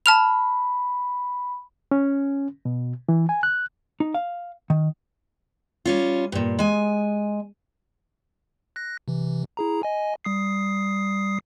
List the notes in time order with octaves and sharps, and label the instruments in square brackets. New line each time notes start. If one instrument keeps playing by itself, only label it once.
[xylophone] A5 F6 F7 [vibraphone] B5
[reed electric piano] C#4
B2
E3
G#5
F#6
[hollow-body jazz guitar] D#4
F5
D#3
[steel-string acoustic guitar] G3 C#4 F4
G2 A#2
G#3 G#5
[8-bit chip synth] F#6 A#6
C3 E3
E4 G#4 A#5
D#5 G#5
G3 D#6 C7